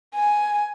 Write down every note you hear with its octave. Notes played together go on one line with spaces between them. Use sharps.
G#5